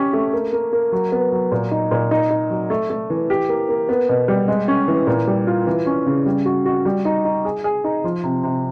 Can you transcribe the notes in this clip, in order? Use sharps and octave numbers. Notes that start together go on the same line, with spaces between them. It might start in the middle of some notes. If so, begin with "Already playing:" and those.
Already playing: C#4 G4
A3
A#3
A#3
A#3
F#3
B3
F#3
A#2
D#4
A#2
D#4
D#4
F#3
A3
A3
E3
G4
A#3
A#3
B3
B2
G3
G#3
C#4
E3
A#2
G3
F4
E3
C#4
C#3
G3
F#4
F#4
G3
D#4
D#4
G#4
G#4
D#4
F3
C3
C3